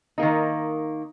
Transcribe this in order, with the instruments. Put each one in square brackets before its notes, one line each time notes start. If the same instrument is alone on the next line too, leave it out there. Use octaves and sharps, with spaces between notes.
[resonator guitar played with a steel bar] D#3 A#3 D#4